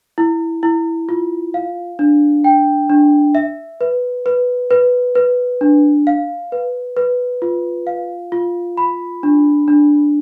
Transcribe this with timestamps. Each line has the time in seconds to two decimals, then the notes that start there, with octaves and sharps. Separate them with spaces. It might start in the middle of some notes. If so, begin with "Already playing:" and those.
0.18 E4
0.63 E4
1.09 F4
1.54 F5
1.99 D4
2.44 G5
2.90 D4
3.35 E5
3.81 B4
4.26 B4
4.70 B4
5.15 B4
5.61 D4
6.07 F5
6.52 B4
6.97 B4
7.42 F4
7.87 F5
8.32 F4
8.77 B5
9.23 D4
9.68 D4